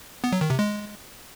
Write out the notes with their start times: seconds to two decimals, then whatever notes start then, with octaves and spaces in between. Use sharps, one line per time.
0.24 B3
0.32 F#3
0.41 D#3
0.50 C3
0.59 G#3